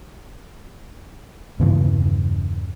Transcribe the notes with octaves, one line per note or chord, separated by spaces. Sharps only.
E2 G2 C#3 E3